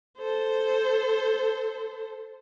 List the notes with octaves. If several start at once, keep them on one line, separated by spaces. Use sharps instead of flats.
A4 C5